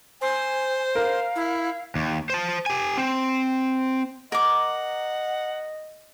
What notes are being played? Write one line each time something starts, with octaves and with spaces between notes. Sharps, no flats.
C5 G#5
A#4 F5
E4
D#2
C5 A5
G4 G#5
C4
A#4 D#5 F#5 D6